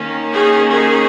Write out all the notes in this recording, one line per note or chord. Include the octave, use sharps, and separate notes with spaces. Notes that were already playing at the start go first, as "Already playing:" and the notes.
Already playing: D#3 A#3 C#4
D#4 G#4
D#4 G#4